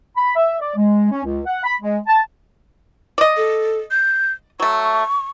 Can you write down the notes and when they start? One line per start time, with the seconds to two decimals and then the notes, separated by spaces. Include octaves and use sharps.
0.17 B5
0.36 E5
0.60 D5
0.76 G#3
1.11 C#4
1.24 C#2
1.46 F#5
1.64 B5
1.81 G#3
2.07 A5
3.18 D5 D#5
3.37 A4
3.91 G6
4.60 F#3 A3 C#6